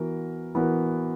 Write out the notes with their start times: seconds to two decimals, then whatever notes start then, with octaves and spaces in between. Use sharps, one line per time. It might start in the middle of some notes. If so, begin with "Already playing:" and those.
Already playing: E3 B3 F#4 A#4
0.55 E3 B3 F#4 A#4